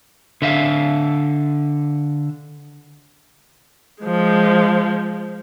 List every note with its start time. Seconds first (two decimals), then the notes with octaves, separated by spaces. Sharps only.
0.42 D3 E5 F5
4.03 F3 G#3